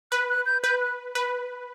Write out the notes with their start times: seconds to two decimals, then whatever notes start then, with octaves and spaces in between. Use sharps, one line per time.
0.12 B4 F#6
0.29 F#6
0.46 G6
0.63 B4 G6
0.81 F#6
1.15 B4